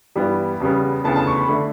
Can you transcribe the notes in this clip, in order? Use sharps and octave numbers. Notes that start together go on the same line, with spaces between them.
G2 E3 G3 B3
E2 C#3 G3 B3
D2 C#3 E3 B3 A5
A5
C#6
B5
D3 A3